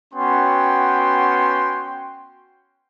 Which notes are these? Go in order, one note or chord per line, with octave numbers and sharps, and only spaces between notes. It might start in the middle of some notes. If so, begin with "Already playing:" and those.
B3 C#4 F#4 G5 C6